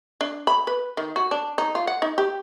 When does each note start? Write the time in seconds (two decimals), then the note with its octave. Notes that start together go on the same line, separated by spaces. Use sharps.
0.21 D4
0.47 B5
0.67 B4
0.97 D#3
1.16 F#4
1.31 D4
1.58 D#4
1.75 F4
1.87 F#5
2.02 D#4
2.18 G4